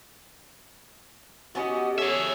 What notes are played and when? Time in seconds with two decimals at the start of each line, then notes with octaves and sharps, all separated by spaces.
1.55 B3 C#4 F#4 G4 D#5
1.98 G#4 A4 C#5 E5